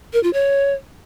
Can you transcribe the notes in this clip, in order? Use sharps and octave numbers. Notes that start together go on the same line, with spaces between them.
A#4
F4
C#5